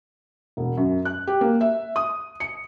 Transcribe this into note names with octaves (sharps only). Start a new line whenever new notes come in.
E1
F#2
F#6
G4
A#3
E5
D#6
C#7